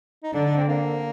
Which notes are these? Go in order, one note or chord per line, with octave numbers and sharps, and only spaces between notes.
D#4
D3 D4
D4
C4
A#3